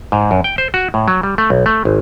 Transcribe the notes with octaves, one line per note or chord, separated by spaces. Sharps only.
G#2
F#2
G5
C5
F#4
A2
F#3
G3
A3
B1
A3
G#1